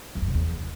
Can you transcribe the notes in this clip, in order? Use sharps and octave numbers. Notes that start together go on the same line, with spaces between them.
F2
F#2
C3
E2